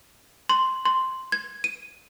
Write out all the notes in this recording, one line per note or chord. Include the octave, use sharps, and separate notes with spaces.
C6
C6
G#6
D#7